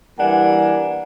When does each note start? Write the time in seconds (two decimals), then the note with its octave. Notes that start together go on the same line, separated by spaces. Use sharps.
0.19 E3 G3 A#3 D4 F#5 G#5